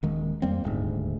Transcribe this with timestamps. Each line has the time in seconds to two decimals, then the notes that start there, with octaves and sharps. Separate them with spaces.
0.03 D#1 D#3 G#3
0.42 F2 G3 A#3 C4
0.64 D#1 D2 G#2